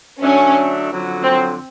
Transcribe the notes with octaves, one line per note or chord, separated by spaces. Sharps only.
D3 F#3 A3 C#4 D4
F2 D3 F#3
C4